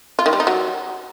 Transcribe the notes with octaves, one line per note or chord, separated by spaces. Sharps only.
F4
D#3
G3
D#4
F#3